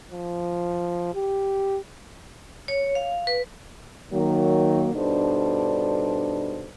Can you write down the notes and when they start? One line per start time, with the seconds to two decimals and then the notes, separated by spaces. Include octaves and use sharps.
0.11 F3
1.15 G4
2.68 C#5
2.95 F5
3.27 B4
4.12 D#3 F#3 A#3
4.94 G2 B2 D4 D#4 A4 C5